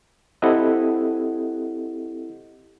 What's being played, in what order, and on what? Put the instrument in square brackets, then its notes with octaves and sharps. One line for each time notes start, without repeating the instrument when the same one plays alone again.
[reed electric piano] C4 E4 G4 A4 D#5 F#5